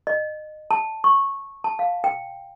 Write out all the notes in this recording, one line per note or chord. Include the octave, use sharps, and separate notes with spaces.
D#5
A5
C#6
A5
F5
G5